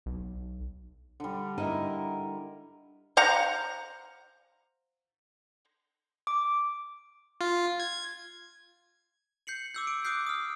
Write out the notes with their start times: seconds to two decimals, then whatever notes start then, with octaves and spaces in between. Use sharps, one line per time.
0.06 B1
1.20 D3 G3
1.58 D#4 E4 A#4
3.17 C5 F5 F#5 A#5
6.27 D6
7.41 F4
7.80 G#6
9.47 G6 C7 C#7 F#7
9.74 D6 E6 G6
9.87 D7
10.05 D6 D#6 F#6 G6 C7
10.27 D#6 F6